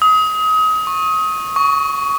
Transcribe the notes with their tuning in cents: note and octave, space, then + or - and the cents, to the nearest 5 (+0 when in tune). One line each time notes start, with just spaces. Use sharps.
D#6 +30
C#6 -20
C#6 +20